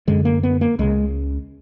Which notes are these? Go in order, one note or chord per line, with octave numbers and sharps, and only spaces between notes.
F#2 D3 G#3
A#3
B3
A#3
C#2 C#3 G#3